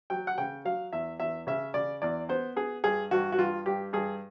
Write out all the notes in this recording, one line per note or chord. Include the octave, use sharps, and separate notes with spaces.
F#3 G5
F#5
C#3 G5
F#3 F5
E2 E5
E2 E5
C#3 E5
C#3 D5
E2 D5
B3 C5
B3 G#4
G2 G#4
G2 F#4
F#4
G2 F4
G2 G4
G2 G#4